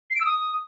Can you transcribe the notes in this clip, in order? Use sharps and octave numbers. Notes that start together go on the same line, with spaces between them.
C7
D7
E6
D#6